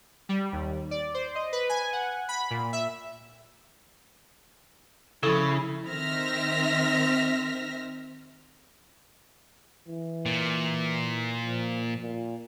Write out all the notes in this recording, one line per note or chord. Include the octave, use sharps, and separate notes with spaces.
G3
D#2
D5
C5
D#5
B4
G#5
F#5
B5
A#2
E5
C#3 F3 E4 A4
D#3 C4 E5 F6 A#6 B6
E3
A#2
F3
A#2